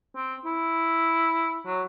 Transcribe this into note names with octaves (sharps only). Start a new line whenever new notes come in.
C4
E4
F#3